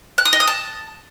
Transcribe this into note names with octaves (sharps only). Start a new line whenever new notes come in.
F#6
D#6
D#5
D#6
A5